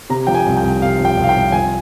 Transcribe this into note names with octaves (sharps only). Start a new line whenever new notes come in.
C3 A#5
F3 G5
G#5
C2
G5
C2
C3 F5
F3
G5
C2
F5
G5
C2
F3 G#5